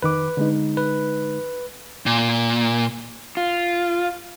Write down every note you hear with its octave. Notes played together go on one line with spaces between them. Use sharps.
F2 D#3 B4 D6
D3 G#3 D#4
B4
A#2
F4